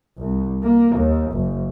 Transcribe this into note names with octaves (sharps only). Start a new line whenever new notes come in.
C2
A#3
D#2
F#1